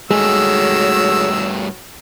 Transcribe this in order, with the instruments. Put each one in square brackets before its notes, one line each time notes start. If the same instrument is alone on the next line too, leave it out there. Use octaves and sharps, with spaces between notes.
[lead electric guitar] G2 A3 [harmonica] D#3 E6 [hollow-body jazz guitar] G#3 [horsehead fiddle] F#4 C#5